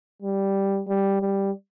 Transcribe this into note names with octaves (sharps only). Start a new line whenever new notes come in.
G3
G3
G3